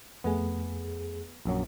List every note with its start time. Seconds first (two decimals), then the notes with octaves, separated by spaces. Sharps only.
0.24 F2 A3 B3 G#4
1.45 A#1 F#2 F#3